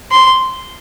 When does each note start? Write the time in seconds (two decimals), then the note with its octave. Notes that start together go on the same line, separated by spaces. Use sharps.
0.11 C6